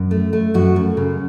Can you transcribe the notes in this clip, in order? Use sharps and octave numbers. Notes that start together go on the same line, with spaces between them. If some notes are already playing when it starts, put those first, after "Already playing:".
Already playing: F#2
A3
A3
F#2 F#4
F#2
C#3